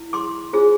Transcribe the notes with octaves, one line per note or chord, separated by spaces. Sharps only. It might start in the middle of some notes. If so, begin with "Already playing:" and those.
Already playing: E4
C6 D6
D4 F4 G#4 C5